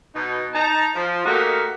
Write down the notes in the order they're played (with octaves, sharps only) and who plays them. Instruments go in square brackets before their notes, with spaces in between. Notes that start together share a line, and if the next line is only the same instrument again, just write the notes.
[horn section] B2 D#4
D#4 A5 A#5
F3
A3 A#3 D#4 F#4 G4 A#4